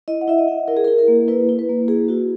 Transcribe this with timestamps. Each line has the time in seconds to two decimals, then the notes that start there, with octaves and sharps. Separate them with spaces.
0.08 E4 D#5
0.21 F#5
0.28 E4 E5
0.38 D#5
0.48 E4
0.68 E4 A#4
0.77 G#4
0.84 A#4
0.88 E4
0.99 A#4
1.08 A#3
1.28 E4 B4
1.49 E4
1.59 B4
1.69 A#3
1.88 E4 G#4
2.08 E4 F#4